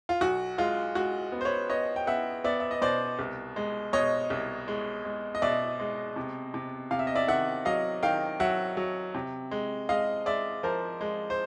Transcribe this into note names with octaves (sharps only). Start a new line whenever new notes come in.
F4
B1 F#4
G#3 F4
G#3 F#4
B3
C5
B4 C#5
B3 C#5 D#5
G5
B3 E5 F#5
B3 D5 E5
E5
D#5
B2 C5 D5
C2
G#3
B2 C#5 D#5
C2
G#3
G#3
D#5
B2 D5 E5
G#3
C3
C3
C3 F5
E5
D#5
D5 E5
D#3 E5 F#5
F#3 D#5 F5
D#3 F5 G5
F#3 E5 F#5
F#3
C3
G#3
G#3 D#5 F5
G#3 D5 E5
F3 A#4 C5
G#3
C5